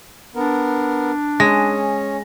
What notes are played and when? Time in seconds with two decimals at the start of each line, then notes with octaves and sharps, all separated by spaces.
0.35 B3 D4 A#4
1.40 G#3 C#4 A#6